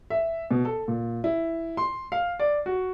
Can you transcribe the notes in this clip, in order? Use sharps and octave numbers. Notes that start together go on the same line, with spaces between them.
E5
B2
A4
A#2
E4
C6
F5
D5
F#4